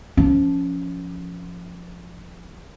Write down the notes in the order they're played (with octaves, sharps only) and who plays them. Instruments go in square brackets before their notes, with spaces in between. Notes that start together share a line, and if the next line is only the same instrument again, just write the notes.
[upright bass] F3 C#4